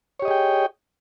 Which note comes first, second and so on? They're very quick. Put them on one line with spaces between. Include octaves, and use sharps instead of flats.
C#5 G4 D#5 G#4 G5